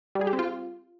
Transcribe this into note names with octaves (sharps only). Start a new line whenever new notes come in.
G3
G#4
G4
C4
F4